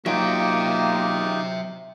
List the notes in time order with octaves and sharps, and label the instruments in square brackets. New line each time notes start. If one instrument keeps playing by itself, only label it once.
[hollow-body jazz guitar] F#3 [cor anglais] A#3 [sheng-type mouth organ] D#4 F4 G4 [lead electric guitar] E5 G5